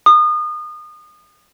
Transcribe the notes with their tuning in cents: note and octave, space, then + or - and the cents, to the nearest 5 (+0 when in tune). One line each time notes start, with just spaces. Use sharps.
D#6 -30